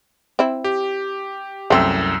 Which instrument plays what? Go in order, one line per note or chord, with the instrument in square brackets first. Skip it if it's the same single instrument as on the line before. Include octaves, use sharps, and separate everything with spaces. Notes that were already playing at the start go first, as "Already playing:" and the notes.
[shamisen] C4 E4
[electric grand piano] G4
[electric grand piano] C2 F#2 E6 [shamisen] A3 C4